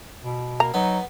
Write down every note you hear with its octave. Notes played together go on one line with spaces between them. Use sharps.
B2
A#3 A#5
F#3 B3 D#4